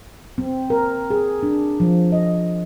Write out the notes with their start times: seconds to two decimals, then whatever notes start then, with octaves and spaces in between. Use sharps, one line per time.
0.38 C4
0.70 A#4
1.10 G#4
1.43 D4
1.80 F3
2.12 D#5